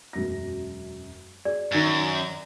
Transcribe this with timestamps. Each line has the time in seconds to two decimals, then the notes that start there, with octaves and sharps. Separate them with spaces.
0.13 E1 F#2 A#6
1.45 G#4 D5
1.72 F#2 D#3 D#4 E7